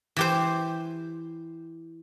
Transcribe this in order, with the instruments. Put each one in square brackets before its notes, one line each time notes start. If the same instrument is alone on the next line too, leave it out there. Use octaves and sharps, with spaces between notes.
[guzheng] E3 G4 C5